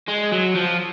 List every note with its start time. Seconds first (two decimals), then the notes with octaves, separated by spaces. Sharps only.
0.08 G#3
0.32 F#3
0.55 F3